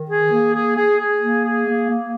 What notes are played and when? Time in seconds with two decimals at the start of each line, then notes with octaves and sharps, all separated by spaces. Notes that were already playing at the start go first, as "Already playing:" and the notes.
Already playing: D#3
0.10 G#4
0.32 A#3
0.54 G#4
0.77 G#4
0.99 G#4
1.22 A#3
1.44 G#4
1.67 A#3
1.89 A#3